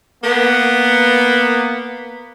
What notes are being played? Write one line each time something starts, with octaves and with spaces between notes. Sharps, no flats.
A#3 B3